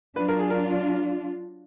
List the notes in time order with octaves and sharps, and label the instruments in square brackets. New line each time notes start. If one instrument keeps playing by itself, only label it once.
[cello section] F#3 D4 F4 [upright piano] B4
[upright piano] A#4
G#4
A#4